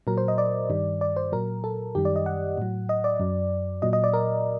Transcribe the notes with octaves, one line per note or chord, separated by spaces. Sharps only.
A#2 F#3 A#4
C5
D#5
D5
G2 D#3 G3
D5
C5
A#2 F#3 A#4
A4
F#2 D#3 G3 G4
D5
D#5
F#5
A2 F#3
D#5
D5
F#2 F#3
A#2 F#3 D#5
D#5
D5
A#4